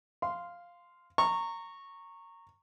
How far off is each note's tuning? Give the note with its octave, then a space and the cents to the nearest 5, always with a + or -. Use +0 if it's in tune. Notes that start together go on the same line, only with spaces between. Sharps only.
F5 +0 C6 -10
A#5 -20 C#6 -10